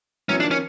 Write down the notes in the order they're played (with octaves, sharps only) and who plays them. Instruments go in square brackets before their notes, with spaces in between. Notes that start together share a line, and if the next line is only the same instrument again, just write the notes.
[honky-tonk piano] E3 F#3 [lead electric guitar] C#4
[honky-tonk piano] D#3 F3 [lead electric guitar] D4
[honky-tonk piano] D#3 F3 [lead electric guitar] C#4